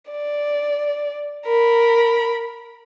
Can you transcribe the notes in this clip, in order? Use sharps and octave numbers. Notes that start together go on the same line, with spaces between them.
D5
A#4 B5